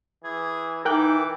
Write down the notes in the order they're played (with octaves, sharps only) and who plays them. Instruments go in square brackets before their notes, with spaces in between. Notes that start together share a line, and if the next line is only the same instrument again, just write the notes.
[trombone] E3 [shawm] G#4
[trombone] E3 [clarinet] D#4 [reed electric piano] A#4 G5 F#6 [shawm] D6